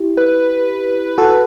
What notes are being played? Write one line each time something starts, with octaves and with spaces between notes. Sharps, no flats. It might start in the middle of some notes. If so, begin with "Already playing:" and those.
Already playing: E4 G4
B4
F#4 A4